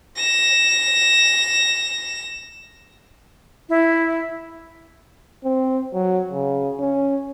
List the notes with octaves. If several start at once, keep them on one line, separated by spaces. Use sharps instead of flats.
A#6 E7
E4
C4
F#3
C#3
C#4